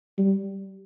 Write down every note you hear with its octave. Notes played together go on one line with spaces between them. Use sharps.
G3